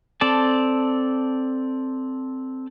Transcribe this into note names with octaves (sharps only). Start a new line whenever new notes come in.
C4 A4 D5 A5